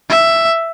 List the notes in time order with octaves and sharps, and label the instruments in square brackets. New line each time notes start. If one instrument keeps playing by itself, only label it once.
[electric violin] E5